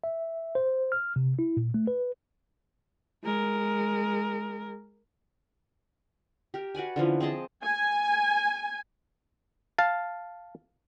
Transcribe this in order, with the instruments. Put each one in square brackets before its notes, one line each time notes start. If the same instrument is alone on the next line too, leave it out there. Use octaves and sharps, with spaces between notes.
[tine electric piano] E5
C5
F6
C3
E4
A#2
A3
B4
[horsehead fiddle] G#3 A#4
[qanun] G4 A#4
F#4 B4 D5 G#5
D3 E3 F3 C#4
C4 G#4 D#5 A5
[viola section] G#5
[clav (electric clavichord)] F5 A5